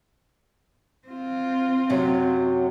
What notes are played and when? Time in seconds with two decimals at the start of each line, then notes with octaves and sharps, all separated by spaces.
1.08 C4 F4
1.90 F#2 C3 F#3